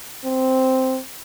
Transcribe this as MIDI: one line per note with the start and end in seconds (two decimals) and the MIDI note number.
0.25 0.99 60